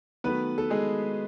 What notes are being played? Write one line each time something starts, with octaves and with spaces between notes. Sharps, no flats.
D#3 F#3 A3 B3 B4
A4
G#3 G#4